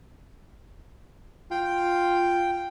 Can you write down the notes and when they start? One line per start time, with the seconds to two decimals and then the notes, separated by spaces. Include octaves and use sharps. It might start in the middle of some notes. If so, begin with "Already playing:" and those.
1.51 F4 G5